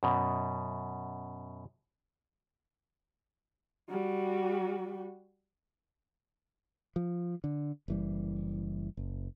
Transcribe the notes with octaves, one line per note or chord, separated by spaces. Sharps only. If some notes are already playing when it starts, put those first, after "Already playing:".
F#2 B2
G3 F#4
F3
D3
F#1 E3 G3
F#1